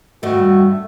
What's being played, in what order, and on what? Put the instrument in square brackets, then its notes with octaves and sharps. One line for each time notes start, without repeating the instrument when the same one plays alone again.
[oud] E2 G2 D#3 [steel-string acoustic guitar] A3 [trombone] F#4